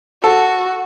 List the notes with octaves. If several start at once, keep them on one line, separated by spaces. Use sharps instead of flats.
F#4 A4